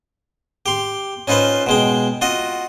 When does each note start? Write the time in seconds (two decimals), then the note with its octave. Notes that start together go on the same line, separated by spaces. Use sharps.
0.66 G4 C6
1.28 C#4 D#4 F4 B4 C5
1.66 B2 G#3 G5
2.21 F4 F#4 D#5